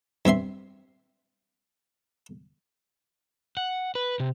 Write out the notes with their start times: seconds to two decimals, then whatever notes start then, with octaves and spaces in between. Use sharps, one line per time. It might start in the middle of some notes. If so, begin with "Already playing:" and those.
0.25 G2 C4 E5 C6
3.57 F#5
3.95 B4
4.20 C3